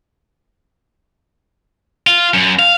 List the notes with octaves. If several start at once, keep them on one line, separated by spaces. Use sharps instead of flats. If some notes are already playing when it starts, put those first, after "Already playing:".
F4
F#2
F5